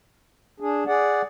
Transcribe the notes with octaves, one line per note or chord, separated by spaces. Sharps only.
D4 G#4
G#4 D5 F#5